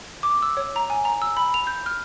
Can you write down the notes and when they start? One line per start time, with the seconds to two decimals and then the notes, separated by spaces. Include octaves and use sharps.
0.23 D6
0.42 E6
0.57 C#5
0.76 A#5
0.90 G#5
1.05 A#5
1.22 E6
1.37 B5
1.54 F7
1.67 G6
1.86 F6